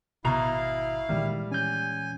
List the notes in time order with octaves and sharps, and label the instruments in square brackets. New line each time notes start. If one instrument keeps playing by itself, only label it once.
[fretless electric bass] G#1 [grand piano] B2 A#5 F7 [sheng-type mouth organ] E4 F5
[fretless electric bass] A#2 E3 G#3 [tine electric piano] D#3 [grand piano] G3
[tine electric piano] C#4 G6 [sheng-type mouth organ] G#5